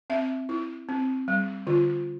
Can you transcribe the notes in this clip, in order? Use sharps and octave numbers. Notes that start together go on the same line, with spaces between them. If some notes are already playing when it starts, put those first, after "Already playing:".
C4 E5
E4
C4
G3
D3 F4